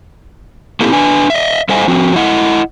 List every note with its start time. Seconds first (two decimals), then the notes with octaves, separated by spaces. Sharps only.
0.80 A#3 C4 E4 G4 A4
0.92 D4 B4 G#5
1.30 D#5 E5
1.69 G3 A4 C5 D#5 F5 G#5
1.88 F3 C4 F#4
2.16 E4 D#5 F#5